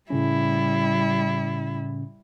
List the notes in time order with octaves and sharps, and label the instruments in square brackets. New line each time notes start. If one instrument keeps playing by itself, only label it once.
[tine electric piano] A2 C#3 C#4 [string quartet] G3 E4